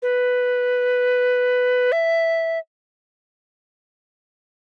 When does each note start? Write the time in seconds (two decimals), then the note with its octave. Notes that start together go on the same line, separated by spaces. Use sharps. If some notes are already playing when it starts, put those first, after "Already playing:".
0.02 B4
1.92 E5